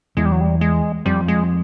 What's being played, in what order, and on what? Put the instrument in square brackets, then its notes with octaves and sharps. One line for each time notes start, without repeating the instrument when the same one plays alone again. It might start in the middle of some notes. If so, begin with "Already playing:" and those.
[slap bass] E2 E3 [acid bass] G#3
[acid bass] G3
F#3
G3
G#3
[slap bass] F2 F3 [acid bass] G3
[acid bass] G#3